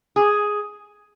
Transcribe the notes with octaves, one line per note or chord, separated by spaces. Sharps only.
G#4